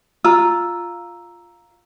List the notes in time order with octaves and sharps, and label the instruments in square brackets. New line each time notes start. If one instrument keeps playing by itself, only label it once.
[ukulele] F4 [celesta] A#5 E6